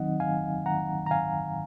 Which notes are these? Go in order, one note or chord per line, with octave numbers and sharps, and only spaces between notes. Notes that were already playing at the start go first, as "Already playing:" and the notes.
Already playing: D#3 F#3 C4 D#4 D#5 F#5
F5 G#5
F#5 A#5
A#5
F5 G#5